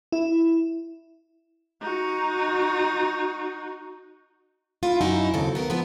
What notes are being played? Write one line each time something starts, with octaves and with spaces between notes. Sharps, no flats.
E4
D#4 F#4
E4 F4
F#2 D#4 E4 F#4
D#2 C#3 C4 A4
B3 A#4
F3 B3 E4